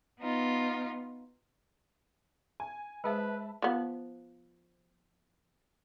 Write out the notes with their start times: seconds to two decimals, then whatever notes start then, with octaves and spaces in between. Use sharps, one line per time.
0.21 B3 D#4 F4
2.60 G#5
3.04 G#3 G#4 B4 C5 E5 A5 B5
3.62 F3 B3